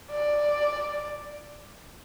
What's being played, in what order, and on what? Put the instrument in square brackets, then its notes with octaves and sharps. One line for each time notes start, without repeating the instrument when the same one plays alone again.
[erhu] D5